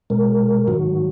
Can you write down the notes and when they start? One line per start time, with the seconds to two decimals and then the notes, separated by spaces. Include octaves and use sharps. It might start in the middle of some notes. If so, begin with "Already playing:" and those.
0.10 B2 G#3 A#4
0.67 G#2 D#3 F#3 F#4